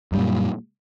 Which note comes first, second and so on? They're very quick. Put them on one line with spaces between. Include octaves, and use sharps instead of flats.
F#2 G3 A#2